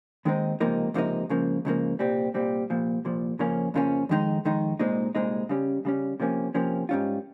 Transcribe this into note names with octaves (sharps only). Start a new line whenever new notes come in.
D#2 D#3 G#3 C4 D#4
C#2 C3 F3 A#3 D#4
C#2 C3 F3 A#3 D#4
C#2 C#3 F3 A#3
C#2 C#3 F3 A#3
C2 A#2 G3 C4
C2 A#2 G3 C4
C2 A#2 F3
C2 A#2 F3
F2 C#3 F3 A#3 C#4
F2 C#3 F3 A#3 C#4
F2 D#3 G#3 D#4
F2 D#3 G#3 D#4
C2 A#2 G#3 C4 D#4
C2 A#2 G#3 C4 D#4
C#3 G3 C#4
C#3 G3 C#4
C3 F3 A#3 C#4
C3 F3 A#3 C#4
G#2 G3 C#4 F4